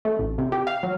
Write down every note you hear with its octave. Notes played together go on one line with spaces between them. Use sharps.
A3
A1
C3
G4
F5
F#3